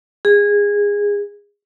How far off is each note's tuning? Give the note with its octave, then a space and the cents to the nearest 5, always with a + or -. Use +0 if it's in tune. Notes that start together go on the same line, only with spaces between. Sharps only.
G#4 -20